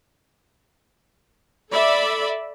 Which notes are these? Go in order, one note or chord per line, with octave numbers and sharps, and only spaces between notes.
A4 D5 E5 B5